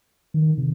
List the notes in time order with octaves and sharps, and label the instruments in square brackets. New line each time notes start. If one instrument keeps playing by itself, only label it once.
[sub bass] D#3
C3